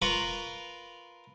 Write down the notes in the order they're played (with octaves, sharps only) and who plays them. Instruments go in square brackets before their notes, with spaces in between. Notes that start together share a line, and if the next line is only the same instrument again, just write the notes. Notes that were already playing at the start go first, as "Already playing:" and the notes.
[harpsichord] F4 A#4 B4 F5 B5 C#6